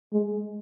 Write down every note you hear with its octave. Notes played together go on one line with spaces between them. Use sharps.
G#3